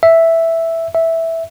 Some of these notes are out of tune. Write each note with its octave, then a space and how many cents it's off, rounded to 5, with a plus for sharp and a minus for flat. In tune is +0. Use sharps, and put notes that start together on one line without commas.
E5 +0
E5 -5